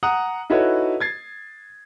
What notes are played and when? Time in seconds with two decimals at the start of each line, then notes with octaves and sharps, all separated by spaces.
0.03 F#5 A#5 D#6
0.50 D#4 E4 F#4 A4 B4 C#5
1.00 G#6 A6 C7